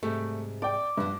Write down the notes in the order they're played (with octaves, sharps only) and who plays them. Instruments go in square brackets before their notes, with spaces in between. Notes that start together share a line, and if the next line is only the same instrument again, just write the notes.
[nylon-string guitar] G#2 C3 G3 [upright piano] A3
[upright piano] D5 G5 [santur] D6
[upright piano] G2 [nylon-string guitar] F3 B3